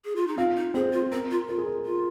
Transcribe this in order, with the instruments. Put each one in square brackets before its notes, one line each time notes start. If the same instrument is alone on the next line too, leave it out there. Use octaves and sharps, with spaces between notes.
[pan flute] G#4
F4
D#4
[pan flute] C4 [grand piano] F4 F5
[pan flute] D#4
[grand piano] C4 C5 [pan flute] G#4
[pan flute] F4
[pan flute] C4 [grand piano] A#4
[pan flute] F4
[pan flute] F4 [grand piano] A#4
[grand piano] G#4
A#4
[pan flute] F4